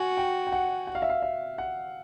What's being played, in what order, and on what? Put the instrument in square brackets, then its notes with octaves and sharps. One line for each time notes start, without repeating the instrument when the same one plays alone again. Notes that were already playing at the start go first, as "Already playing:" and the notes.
Already playing: [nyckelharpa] F#4 [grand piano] G#5
[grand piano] G5
G5
F#5
F#5
F5
E5
F5
E5
F#5